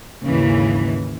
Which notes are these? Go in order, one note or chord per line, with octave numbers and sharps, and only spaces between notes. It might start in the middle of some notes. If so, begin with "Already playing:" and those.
G#1 D#2 C#3 E3